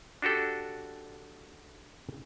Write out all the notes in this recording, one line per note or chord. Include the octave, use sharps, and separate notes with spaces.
D4 F#4 G4 A4